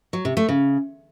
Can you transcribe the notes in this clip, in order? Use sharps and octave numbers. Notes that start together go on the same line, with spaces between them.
F#3
C3
A3
C#3